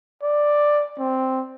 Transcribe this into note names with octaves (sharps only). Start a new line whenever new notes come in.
D5
C4